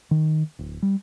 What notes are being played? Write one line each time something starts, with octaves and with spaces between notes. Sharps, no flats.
D#3
D1
G3